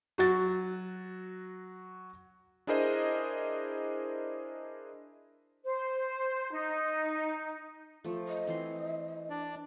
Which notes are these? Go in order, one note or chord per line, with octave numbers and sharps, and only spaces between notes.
F#3 F#4 A6
D4 E4 G#4 A#4 C5 D#5
C5
D#4
F3 A3
D#5
E3 C4 C6
D4 D5